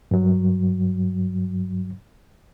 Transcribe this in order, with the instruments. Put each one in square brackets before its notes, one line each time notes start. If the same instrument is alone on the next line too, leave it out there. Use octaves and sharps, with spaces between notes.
[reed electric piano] G2 F#3